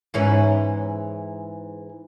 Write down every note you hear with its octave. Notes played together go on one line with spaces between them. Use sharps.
G#2 E3 C#4